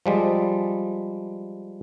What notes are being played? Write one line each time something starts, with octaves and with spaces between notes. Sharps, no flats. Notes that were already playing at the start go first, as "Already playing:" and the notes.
F3 G3 G#3